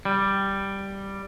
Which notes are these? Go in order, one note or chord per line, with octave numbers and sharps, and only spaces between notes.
G3